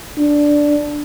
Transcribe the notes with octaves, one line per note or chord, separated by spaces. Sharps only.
D4